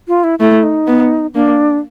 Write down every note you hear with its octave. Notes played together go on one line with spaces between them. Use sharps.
F4
E4
A3 E4
D#4
B3
A#3 D4